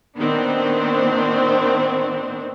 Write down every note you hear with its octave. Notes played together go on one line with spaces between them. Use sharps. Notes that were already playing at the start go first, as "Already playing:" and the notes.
A#2 D#3 B3 C4 D4